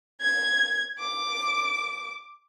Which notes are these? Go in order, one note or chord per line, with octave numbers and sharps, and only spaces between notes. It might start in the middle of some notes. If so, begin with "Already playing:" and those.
G#6
D6